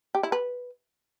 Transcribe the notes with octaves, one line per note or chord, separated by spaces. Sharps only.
G4
E4
B4